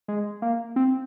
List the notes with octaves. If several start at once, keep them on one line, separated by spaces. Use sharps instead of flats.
G#3
A#3
C4